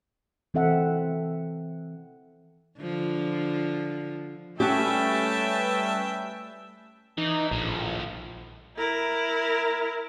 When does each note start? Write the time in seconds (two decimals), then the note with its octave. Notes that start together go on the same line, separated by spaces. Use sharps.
0.54 E3 C4 A4 E5 F#5
2.79 D3 F3
4.60 G3 A3 C#4 G4 B4 E5 G5 A5
7.18 E3 D#4
7.51 A#1 A2 F3
8.77 E4 A#4